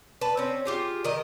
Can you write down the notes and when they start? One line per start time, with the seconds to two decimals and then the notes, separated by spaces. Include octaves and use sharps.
0.21 B4 A5
0.37 C4 C#4
0.65 F4 G4 G#4
1.04 D#3 A#4 D#5